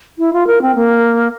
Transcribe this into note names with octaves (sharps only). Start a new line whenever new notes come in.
E4
F4
A#4
C4
A#3